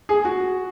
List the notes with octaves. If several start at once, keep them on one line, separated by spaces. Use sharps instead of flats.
G#4
F#4